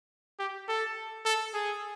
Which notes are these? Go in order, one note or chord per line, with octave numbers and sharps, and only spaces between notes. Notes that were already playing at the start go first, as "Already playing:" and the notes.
G4
A4
A4
G#4